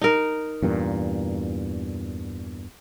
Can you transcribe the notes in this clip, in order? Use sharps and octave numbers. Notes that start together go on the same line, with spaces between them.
D#4 A#4
E2 G2 A#2